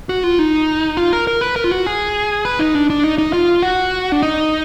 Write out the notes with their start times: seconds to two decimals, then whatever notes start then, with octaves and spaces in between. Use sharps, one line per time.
0.09 F#4
0.23 F4
0.39 D#4
0.97 F4
1.13 A#4
1.27 A#4
1.41 B4
1.56 A#4
1.64 F4
1.71 F#4
1.86 G#4
2.45 B4
2.59 D#4
2.75 D4
2.90 D4
3.04 D#4
3.18 D#4
3.33 F4
3.63 F#4
4.12 D4
4.22 D#4